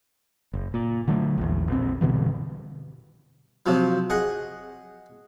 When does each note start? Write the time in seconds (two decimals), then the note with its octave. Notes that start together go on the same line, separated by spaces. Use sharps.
0.53 F#1
0.74 A#2
1.08 D3 F#3 A3
1.37 A#1 E2
1.68 A#1 C4
2.01 G2 B2 D3 E3
3.66 C3 F3 F#3
4.10 G#4 D#5 F#5